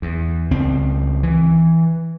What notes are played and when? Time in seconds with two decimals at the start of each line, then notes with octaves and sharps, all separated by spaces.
0.02 E2
0.51 C#2 C4
1.23 E3